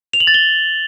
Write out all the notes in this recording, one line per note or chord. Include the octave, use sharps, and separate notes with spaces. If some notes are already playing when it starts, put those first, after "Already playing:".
F7
F#7
A6
G7